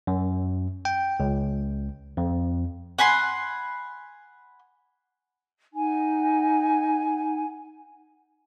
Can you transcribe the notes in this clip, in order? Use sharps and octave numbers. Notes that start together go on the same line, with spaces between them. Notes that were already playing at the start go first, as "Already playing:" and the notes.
F#2
G5
C#2
F2
F#5 G#5 B5 C6
D#4 F#5 G#5